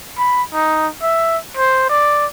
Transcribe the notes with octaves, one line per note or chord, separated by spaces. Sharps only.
B5
D#4
E5
C5
D5